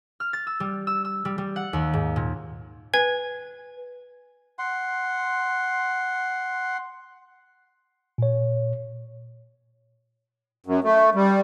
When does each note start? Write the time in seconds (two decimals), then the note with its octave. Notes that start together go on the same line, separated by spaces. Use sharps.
0.20 F6
0.33 A6
0.47 E6
0.60 G3
0.87 E6
1.05 E6
1.25 G3
1.38 G3
1.56 F#5
1.73 D#2
1.94 G#2
2.16 A#2
2.94 B4 G#5 G#6
4.59 F#5 C6
8.18 A#2 C#5
10.66 F#2
10.84 A3
11.15 G3